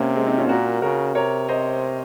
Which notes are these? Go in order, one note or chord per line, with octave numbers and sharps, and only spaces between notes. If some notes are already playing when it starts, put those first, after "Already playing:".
Already playing: C3 A#3 C#4
G#3 C4
C4 D#4
C#4 F4
A#2 F#4 A#4
C#3 F#4 A#4
C3 A#4 C#5
C5 D#5